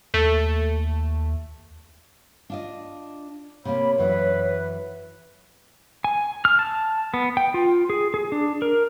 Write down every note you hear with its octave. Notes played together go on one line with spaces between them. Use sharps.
D#2 A3
D4 F4 D#5
C3 A#3 C#5 B5
F#2 E3 B4
G#5
F6
A5
B3
G5
F4
G#4
G#4
D4
A#4